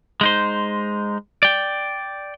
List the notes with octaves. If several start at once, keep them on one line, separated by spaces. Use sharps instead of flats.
G#3 D#4 C5
D5 G5